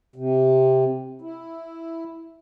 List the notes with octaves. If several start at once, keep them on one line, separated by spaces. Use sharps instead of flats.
C3
E4